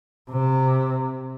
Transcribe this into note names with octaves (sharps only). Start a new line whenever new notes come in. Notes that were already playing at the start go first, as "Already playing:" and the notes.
C3